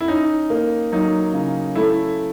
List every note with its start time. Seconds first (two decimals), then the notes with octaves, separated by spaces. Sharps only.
0.01 E4
0.08 C#4 D#4
0.50 A#3
0.92 F#3 D#4
1.34 C#3
1.75 A3 E4